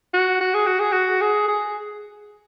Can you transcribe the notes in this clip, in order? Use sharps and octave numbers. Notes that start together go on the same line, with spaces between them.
F#4
F#4
G#4
F#4
G#4
F#4
G#4
G#4